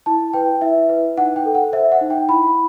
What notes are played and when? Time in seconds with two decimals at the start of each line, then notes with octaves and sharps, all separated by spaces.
0.06 E4 A5
0.33 B4 G5
0.61 E4 E5
0.89 B4
1.17 D#4 F#5
1.36 G5
1.45 A4
1.55 F#5
1.72 C5 E5
1.92 F#5
2.01 D#4
2.10 G5
2.29 E4 B5